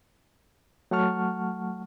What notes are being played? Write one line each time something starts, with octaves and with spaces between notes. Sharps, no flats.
F#3 A3 F#5 A5 C#6 F6